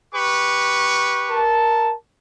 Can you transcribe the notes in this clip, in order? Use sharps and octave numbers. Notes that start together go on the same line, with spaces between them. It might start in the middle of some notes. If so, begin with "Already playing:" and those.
G4 B4 C#6
A#4 A5